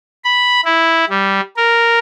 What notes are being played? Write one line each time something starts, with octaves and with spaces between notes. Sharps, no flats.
B5
E4
G3
A#4